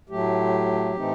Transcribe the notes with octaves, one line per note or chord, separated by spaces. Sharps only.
A2 F#3 A3 G4
A2 E3 A3 C4 D#4